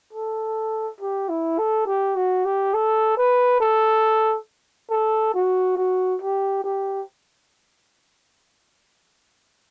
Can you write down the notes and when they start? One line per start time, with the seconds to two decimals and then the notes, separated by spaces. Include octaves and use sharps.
0.13 A4
1.00 G4
1.29 E4
1.58 A4
1.86 G4
2.16 F#4
2.45 G4
2.74 A4
3.18 B4
3.60 A4
4.90 A4
5.34 F#4
5.77 F#4
6.21 G4
6.64 G4